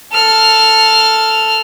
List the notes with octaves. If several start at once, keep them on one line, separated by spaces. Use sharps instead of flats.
A4 F6